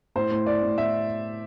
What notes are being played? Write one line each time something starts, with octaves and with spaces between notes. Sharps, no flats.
A2 C5
A2
A2 D5
A2
A2 E5